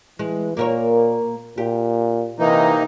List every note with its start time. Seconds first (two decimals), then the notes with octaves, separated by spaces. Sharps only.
0.19 E3 G#3
0.57 A#2 A#3 A#4 C#5
1.58 A#2 G4
2.39 C3 E3 A#3 D#4